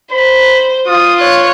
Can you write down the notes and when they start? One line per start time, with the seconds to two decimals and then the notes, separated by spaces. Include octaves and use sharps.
0.12 C5 B5
0.87 F4 D#6
1.20 C#5 F#6